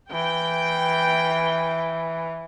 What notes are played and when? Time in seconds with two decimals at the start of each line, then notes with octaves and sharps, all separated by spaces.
0.12 E3 G5